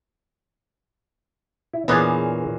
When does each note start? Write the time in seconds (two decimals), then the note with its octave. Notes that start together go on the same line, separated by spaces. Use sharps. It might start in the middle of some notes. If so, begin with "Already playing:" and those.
1.73 E4
1.88 E2 A#2 B3 D4 G#4 C#5